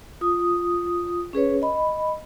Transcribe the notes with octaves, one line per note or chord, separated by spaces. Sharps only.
F4 D#6
C#4 G#4 B4 C#5
D#5 B5